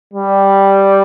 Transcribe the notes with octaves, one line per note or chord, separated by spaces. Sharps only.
G3